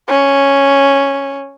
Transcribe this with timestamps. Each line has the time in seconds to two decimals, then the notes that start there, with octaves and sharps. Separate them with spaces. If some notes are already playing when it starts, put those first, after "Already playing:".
0.09 C#4